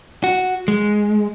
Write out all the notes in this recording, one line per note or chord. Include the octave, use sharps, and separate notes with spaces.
F#4
G#3